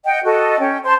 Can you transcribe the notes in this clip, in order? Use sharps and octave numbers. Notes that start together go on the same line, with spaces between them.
D#5 F#5 G5
F#4 A4 D#5
C#4 G5
C5 A5 C6